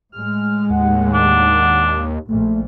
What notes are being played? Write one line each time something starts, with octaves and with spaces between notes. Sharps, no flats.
A2 G#3 F6
D#2 F#5
D4
A#1 A#2 A3